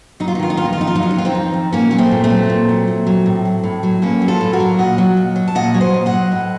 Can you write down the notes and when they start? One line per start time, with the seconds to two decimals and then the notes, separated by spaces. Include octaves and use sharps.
0.20 F#3 D#4
0.28 F4
0.35 D#4
0.39 D#3 F4
0.50 D#4
0.57 F2 F4
0.65 D#4
0.73 F4
0.78 F2 D#4
0.87 F4
0.95 F#3 D#4
1.03 F4
1.11 D#4
1.16 D#3 F4
1.25 C4 D#4
1.35 F2
1.53 F2
1.73 A#2 A#3 C#4
1.91 F#3 A#3
1.98 A3 C4
2.11 A#2
2.24 A3 C4
2.30 F#3
2.50 A#2
2.69 F#3
2.87 A#2
3.06 F#3
3.26 A2
3.45 F#3
3.64 A2
3.83 F#3
4.02 A2 A#3 C#4
4.22 F#3
4.28 F4 A4
4.40 A2
4.53 F#4 A#4
4.60 F#3
4.79 A#2 D#5 F#5
4.98 F#3
5.17 A#2
5.36 F#3
5.48 A5
5.55 A#2 D#5 F#5
5.74 F#3 C#5
5.81 C5 D#5
5.94 A#2
6.06 D#5 F#5
6.13 F#3
6.32 A2